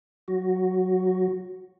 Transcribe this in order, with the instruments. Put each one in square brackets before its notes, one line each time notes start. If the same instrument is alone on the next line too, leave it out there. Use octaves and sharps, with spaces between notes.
[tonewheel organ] F#3 F#4